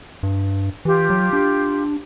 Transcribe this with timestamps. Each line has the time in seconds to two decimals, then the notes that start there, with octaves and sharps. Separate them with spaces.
0.23 G2
0.85 E3 F4 G4
1.10 F#3
1.33 D4